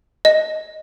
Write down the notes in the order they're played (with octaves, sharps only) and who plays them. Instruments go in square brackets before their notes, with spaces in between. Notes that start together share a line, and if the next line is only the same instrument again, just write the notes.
[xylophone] D#5